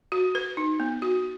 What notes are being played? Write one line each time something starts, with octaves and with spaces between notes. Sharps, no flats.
F#4
B4
D#4
B3
F#4